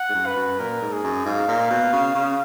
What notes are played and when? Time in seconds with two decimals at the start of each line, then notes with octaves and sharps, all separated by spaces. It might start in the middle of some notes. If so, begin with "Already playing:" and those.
Already playing: F#5
0.10 G#2
0.14 F#2
0.26 B4
0.37 F#2
0.59 A#2 A#4
0.81 G#2
0.92 G#4
1.04 F#2
1.26 G#2 F5
1.48 A#2
1.70 B2
1.93 C#3
2.15 C#3